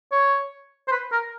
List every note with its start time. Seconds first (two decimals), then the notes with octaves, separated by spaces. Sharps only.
0.12 C#5
0.88 C5
0.91 B4
1.12 A#4